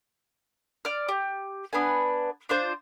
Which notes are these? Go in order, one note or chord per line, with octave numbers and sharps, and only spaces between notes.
D5 F6
G4
B3 D4 B4 G#5
D4 F4 C5